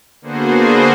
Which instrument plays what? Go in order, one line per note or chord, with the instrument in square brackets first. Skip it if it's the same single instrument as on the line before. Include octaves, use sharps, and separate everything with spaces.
[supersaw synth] D3 A#3 B3 F#4 G#4 C5